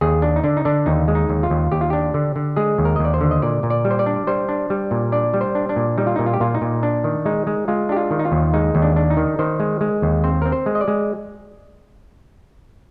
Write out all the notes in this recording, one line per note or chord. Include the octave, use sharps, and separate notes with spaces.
D#2 G#4
D4
D#4
D3 D4
D#4
D3 D4
D#2 D#4
G#3
D#4
D#2
F4
D#2
D#2 G4
F4
D4 G4
D3
D3
G#3 G#4
D#2
A#4
D#2 D#5
D5
C5
D3
D#5
A#2 D5
A#2
D5
G3
C5
D5
D4
G3 C5
D4
G3
A#2
D4 D5
G3
C5
D4
D4
A#2
G3 D#4
F4
A#2 D#4
F4
G4
A#2 F4
D#4
A#2
D4
D#3
G#3 D#4
G#3
G#3 F4
D4 G4
F4
D#3
D#4
F4
D#2
G#3 D#4
D#2
D4
D4
D#4
D#3
D#3 C5
G#3
G#3
D#2
C4 C5
C4 A#4
C5
G#3
D#5
D5
G#3